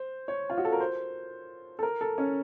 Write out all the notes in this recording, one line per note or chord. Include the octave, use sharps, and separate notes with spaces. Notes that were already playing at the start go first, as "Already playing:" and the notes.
Already playing: C5
C#5
F4
F#4
A4
A#4
C5
A4
A#4
A4
C#4